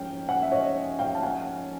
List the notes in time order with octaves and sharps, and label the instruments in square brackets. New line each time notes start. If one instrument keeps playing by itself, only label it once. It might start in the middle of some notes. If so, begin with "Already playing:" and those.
Already playing: [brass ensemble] G#2 F3 A#3 C#4 [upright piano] G5
[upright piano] F#5 G#5
E5
C#5 D#5
F5 G5
A5
F#5 G#5